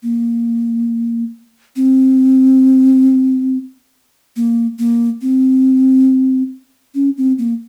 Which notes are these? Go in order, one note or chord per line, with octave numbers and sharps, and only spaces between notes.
A#3
C4
A#3
A#3
C4
C#4
C4
A#3